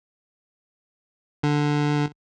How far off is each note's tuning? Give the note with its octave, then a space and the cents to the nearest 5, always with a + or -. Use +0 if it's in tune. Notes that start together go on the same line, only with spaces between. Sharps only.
D3 +5